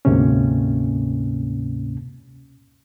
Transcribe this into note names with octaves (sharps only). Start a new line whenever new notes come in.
D2 G#2 C3 A#3 C#4